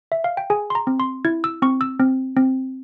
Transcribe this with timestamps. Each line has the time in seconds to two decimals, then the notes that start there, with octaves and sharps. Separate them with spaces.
0.12 E5
0.24 F5
0.37 G5
0.50 G#4 G#5
0.70 C6
0.75 A#5
0.87 C4
1.00 C6
1.25 E4 G#6
1.44 E6
1.62 C4 C#6
1.81 E6
2.00 C4
2.37 C4